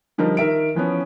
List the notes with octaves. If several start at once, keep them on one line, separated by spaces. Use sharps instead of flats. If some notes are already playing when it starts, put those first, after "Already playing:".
D3 F3 G3 D#4 A#4
D#3 A#4 E5 D7
E3 F3 B3 C#4